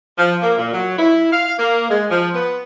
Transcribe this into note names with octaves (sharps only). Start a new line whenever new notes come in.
F3
A#3
A#2
F#3
E4
F5
A#3
G#3
F3
B3